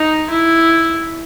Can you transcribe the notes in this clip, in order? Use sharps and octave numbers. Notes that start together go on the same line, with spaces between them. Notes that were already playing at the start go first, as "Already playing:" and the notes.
Already playing: D#4
E4